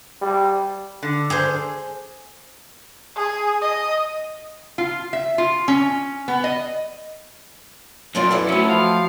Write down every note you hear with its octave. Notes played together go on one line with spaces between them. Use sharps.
G3
D3
G#4 C5
G#4
D#5
F4
E5
F4
C#4
B3
D#5
F#2 A#3 F4 D5
E4 A4 B4 D5
F#3 A3 B3 C#4
F3 F5